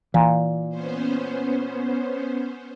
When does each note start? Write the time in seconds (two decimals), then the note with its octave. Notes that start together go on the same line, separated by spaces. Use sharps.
0.14 A#2 E3
0.69 B3 C#4 C5